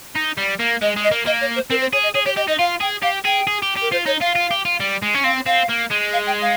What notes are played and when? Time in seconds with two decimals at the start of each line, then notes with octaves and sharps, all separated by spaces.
0.16 D#4
0.37 G3
0.59 A#3
0.82 G#3 D#5
0.96 G#3
1.04 D#5
1.11 A#3
1.26 A#3 D#5
1.41 C#5
1.56 C5
1.70 C4 A#4
1.81 C5
1.93 G#4 C#5
2.03 D#5
2.14 G#4 C#5
2.25 G4 C#5
2.36 G4 D#5
2.48 D#4 D#5
2.59 F4 F5
2.81 G#4 G5
3.03 G4 F5
3.25 G#4 G5
3.47 G#4
3.62 G4
3.76 G4
3.81 A#4
3.92 F4 C5
4.06 D#4 C#5
4.21 F4 F5
4.36 F4
4.51 G4
4.65 F4
4.80 G3
5.02 G#3
5.15 C#4
5.24 C4 F5
5.46 C4 F5
5.69 A#3
5.90 G#3
6.13 F5
6.27 G5
6.42 F5